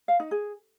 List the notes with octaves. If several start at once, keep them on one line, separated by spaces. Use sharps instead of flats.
F5
D#4
G#4